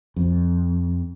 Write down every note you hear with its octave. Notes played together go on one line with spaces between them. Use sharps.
F2